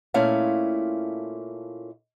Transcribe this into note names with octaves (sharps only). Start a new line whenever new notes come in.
A#2 A3 C#4 E4 F5